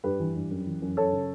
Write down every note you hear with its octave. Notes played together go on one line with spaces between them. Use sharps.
G2 G4 B4
E3
G2
F#2
E3
F#2
F#2 A4 C#5
C#3